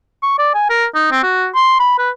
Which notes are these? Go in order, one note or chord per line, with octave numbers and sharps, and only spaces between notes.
C#6
D5
G#5
A#4
D#4
C4
F#4
C6
B5
B4